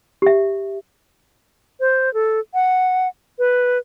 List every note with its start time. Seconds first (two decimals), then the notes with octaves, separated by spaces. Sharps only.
0.22 G4 E5
1.80 C5
2.14 A4
2.54 F#5
3.39 B4